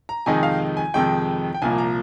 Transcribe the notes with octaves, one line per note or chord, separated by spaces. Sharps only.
A#5
F2 C3 D#3 G#3 D#4 G#5
F5
G#5
F2 C3 D#3 G#3 D#4 G5
G5
C2 A#2 F3 A#3 G#5
A#5